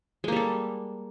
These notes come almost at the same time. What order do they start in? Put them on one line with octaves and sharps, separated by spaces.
G#3 A#3 G3 A4